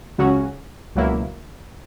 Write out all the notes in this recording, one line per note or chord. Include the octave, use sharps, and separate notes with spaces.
C#2 C#3 F#3 C#4 F#4
C#2 B2 F#3 A#3 E4